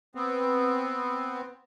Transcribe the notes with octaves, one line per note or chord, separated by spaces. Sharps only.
B3 C4